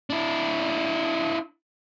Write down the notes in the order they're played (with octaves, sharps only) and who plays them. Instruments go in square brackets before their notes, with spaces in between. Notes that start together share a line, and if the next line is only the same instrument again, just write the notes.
[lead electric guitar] D4 E4